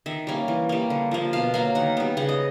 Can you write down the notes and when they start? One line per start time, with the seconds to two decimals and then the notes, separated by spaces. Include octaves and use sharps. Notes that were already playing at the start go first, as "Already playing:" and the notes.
0.06 D#3 E5
0.27 G3 A#3 C#4
0.48 E3
0.69 G3 A#3
0.90 D3
1.11 F3 A#3
1.33 B2 F5
1.54 F#3 A#3 F5
1.75 D#3 F#5
1.97 G3 B3
2.17 C#3 F#5
2.29 D#5